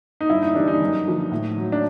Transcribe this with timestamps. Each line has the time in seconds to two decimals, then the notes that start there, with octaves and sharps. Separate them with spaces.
0.21 D#4
0.30 G2 E4
0.42 D#4
0.55 E3 G3 D4
0.68 D#4
0.81 F#2
1.06 D3 F3
1.31 A2
1.56 F#3
1.72 D4